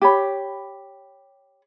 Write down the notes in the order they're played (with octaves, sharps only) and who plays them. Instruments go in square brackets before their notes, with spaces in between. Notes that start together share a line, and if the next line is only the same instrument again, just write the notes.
[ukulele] G4 C#5 B5